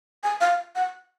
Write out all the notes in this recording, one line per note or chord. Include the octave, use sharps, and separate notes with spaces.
G#5
F5
F#5